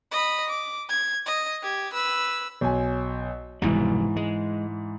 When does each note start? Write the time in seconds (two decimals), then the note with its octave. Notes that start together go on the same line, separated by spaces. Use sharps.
0.12 D#5 B5
0.49 D6
0.89 G#6
1.26 D#5
1.63 G4 G#6
1.94 B4 E6
2.61 B1 G#5
3.62 F1 G#2 B2 E3 G3
4.16 G#3